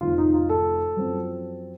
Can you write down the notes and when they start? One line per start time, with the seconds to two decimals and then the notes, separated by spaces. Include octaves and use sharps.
0.01 F1 F2 D#3 F4
0.18 D#4
0.34 F4
0.49 A4
0.97 F#2 F3 C4